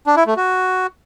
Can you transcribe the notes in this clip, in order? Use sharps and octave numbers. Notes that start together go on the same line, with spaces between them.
D4
E4
A3
F#4